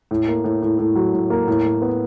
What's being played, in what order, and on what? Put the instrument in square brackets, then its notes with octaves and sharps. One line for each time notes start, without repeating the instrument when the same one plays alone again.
[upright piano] A2
A#3
A2
A2
A2
F#3
A2
A#3
A2
A2
B3